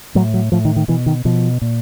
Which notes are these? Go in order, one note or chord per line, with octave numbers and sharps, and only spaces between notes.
A2 F#3
F#3
A2 F3
D#3
D#3
B2 E3
D#3
B2 F3
A#2